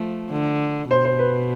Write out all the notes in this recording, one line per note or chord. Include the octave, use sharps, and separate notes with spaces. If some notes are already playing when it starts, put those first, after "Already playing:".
Already playing: F3 A3
D3
B2 C5
C5
B4